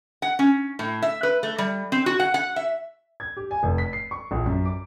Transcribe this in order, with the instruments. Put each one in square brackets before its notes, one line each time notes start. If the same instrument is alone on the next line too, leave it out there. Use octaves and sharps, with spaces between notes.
[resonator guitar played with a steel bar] F#5
C#4
A2
E5
B4
A3
G3
C4
F#4
F#5
F#5
E5
[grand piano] G#6
G4
G#5
F1
B6
C7
C#6
A#1
F#2
D6